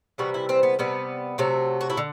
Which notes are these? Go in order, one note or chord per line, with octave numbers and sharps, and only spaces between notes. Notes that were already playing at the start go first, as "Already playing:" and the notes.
C3 E3 G3 F#4
E4
C4
B3
C3 G3 B3
C3 F#3 A3
F#4
E4
D3